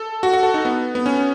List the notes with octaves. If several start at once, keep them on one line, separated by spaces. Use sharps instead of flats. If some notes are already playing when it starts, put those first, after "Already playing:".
Already playing: A4
F#4
F#4
A4
D#4
B3
B3
C#4